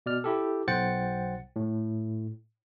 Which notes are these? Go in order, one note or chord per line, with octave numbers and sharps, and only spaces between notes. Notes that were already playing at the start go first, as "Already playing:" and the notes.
B2 D5 F6
E4 G4 A4
B1 C5 F#5 G5 A6 C#7
A2